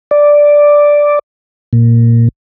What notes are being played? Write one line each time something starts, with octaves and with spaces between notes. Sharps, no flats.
D5
A#2